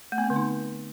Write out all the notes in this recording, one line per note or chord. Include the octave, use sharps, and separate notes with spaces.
A3
B3
C4
D3
D#4